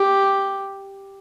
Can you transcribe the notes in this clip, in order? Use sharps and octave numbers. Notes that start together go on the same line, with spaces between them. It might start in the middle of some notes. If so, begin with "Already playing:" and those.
Already playing: G4